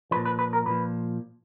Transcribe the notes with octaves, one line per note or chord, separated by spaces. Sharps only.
A#2 F3 B4
B4
B4
A#4
A#2 F3 B4